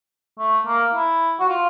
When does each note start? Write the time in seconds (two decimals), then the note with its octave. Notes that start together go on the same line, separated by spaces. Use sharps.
0.39 A3
0.67 A#3
0.95 E4
1.40 F#4
1.49 F4